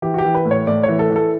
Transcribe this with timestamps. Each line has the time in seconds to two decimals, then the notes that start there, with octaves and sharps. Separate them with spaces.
0.02 E3 G4
0.14 F#4
0.18 G4
0.24 E3
0.35 B4
0.45 A2
0.51 C#5
0.67 A2 D5
0.83 E3 C#5
0.99 A4
1.10 E3
1.16 A4